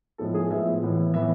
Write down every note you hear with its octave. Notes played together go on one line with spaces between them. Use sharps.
A2 F3 G#3 B3 A4
G#4
A2 F3 G#3 B3 E5
A2 E3 B3
A2 E3 B3 E5